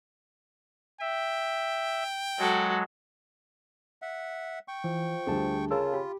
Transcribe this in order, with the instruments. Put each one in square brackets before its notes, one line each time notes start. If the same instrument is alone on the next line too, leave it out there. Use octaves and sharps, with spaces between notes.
[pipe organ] E5 [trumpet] G5
[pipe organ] F#3 G#3 [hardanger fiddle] F#4 A4
[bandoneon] E5 F#5
G5 C#6
[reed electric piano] E3 [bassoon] F3
[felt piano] D2 D3 G3 [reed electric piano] G#4 A5
[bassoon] C#3 [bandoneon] F4 [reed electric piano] G#4 A#4 A5 [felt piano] E6
[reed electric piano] G4 [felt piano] B5